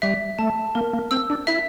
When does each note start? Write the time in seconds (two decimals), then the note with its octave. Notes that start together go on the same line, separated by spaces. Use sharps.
0.02 G3 E5
0.39 A3 A5
0.75 A#3 A#4
0.93 A#3
1.11 C4 E6
1.30 D4
1.47 E4 E5